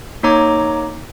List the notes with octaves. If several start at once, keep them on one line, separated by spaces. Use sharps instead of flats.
A#3 D#4 C#5 A#5 D6